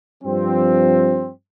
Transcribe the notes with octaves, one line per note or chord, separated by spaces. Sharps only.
G2 F3 C4